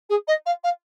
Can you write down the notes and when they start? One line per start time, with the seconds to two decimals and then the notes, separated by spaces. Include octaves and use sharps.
0.09 G#4
0.27 D#5
0.45 F5
0.63 F5